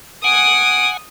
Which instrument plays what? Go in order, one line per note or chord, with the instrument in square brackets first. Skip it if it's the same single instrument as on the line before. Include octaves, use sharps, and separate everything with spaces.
[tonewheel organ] F#5 G#5 [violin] D#6 [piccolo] D7